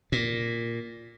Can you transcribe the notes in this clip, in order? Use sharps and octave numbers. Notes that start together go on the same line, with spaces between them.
A#2